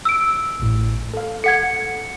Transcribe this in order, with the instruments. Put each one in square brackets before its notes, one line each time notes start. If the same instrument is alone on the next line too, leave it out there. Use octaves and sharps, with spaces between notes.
[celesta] E6 D7
[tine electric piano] A1 A2
A4 F5
[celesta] A4 F#5 G#6 [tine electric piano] C#7